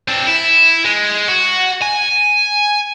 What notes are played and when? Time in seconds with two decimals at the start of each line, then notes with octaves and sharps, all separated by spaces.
0.08 C4 D4
0.27 E4
0.85 G#3
1.28 F#4
1.82 G#5